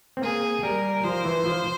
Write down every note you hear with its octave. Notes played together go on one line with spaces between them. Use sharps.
C4
A#3 G#4
G3 A#4
F3 C5
E3
F3